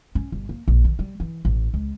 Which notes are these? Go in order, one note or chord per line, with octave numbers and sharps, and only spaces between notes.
C#4
G1
A#3
A#1
D#3
G3
E3
A1
C#2